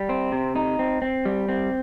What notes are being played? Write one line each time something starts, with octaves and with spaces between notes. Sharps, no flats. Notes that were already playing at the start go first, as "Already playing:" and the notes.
Already playing: G3
C4
C3
D#4
C4
C4
G3
C4